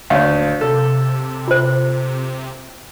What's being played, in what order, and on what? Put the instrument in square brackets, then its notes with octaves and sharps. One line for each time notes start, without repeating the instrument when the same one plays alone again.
[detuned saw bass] D#1 [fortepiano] D2 [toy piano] C#5 F5
[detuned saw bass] C3 [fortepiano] A4
[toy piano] F4 C5